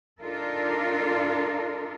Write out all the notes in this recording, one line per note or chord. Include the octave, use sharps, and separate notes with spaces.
D4 D#4 F4 A4 A#4